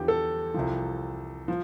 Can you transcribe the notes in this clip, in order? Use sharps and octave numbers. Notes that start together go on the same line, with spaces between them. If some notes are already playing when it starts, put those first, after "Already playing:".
Already playing: E2 D3 F3 G4
A4
C2 C3 F3
F3